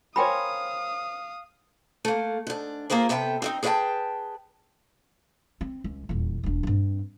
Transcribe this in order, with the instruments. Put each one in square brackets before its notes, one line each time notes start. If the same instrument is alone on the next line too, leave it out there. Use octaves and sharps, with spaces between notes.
[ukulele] A#4 C5 C#5 [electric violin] F5 D#6 [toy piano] G5 G#5 B5
[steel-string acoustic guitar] A3 A#3
G#2 D4
A#3 F4 G#4 A#4 C5
C3 B3 A4 D#5 G5
C4 D4 D#4
G#4 B4 D5 F5 G5 A5
[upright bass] C4
C#2
D#1 E2
E1 D4
G2 C4